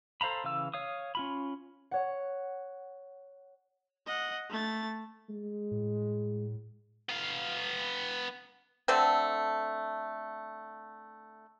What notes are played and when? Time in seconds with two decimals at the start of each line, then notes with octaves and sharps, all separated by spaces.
0.21 A4 C5 F5 A#5 B5
0.44 C#3 E3 F5 E6
0.74 C#5 F5 D#6
1.15 C#4 F4 B5
1.91 C#5 F#5
4.07 D#5 F#5
4.50 A3 A6
5.30 G#3
5.71 A2
7.09 B3 F5
8.88 D3 A3 C4